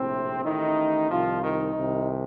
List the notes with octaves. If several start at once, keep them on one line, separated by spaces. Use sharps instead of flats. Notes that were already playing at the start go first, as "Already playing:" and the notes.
Already playing: A#1 A2 C3 C4
A1 A2 D#3 D#4
C2 C3 D#3 F3 F4
D#3 D#4
C2 C3 D#3